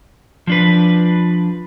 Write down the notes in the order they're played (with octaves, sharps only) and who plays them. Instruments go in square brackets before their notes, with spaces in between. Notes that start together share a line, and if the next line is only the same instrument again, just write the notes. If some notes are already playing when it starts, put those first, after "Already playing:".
[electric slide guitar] F3 D4 B4